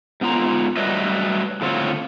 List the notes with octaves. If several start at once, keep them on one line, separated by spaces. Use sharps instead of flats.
G#2 B3 F4 A#5
F#3 G3 A3 B4 D#5 E5
A2 D3 C4 F4 C#5